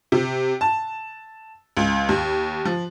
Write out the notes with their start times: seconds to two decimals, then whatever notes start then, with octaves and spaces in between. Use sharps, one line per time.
0.12 C3
0.61 A5
1.77 C#2
2.09 D#2
2.65 F3